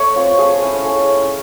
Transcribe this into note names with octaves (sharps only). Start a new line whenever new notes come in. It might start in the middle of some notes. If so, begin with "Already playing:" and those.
Already playing: A3 C#5
C4 F4
A3 G#4
C#4 E4
A3 G#4
C#4 E4